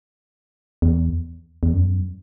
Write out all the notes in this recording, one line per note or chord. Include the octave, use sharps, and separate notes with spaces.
E2
E2
F#2